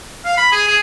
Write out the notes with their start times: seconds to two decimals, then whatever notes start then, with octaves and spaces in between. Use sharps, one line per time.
0.25 F5
0.38 B5
0.52 G#4
0.68 G#4